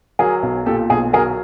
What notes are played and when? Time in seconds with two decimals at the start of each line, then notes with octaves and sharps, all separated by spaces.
0.19 F#3 G#4 A#4
0.43 B1
0.66 A#2 G4 A4
0.90 B1 G#4
1.13 F#3 G#4 A#4